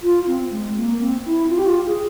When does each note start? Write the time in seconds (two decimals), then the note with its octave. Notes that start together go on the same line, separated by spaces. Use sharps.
0.03 F4
0.27 C4
0.51 G#3
0.77 A#3
1.00 C4
1.26 E4
1.49 F4
1.58 G4
1.66 F4
1.86 G#4